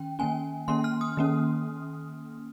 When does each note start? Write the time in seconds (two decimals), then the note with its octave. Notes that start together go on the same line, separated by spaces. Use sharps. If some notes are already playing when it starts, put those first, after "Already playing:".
Already playing: D#3 C#4 G5
0.19 D#3 A#3 C#4 G#5
0.68 D#3 A#3 C#4 C6
0.84 F6
1.01 D#6
1.17 D#3 A#3 C#4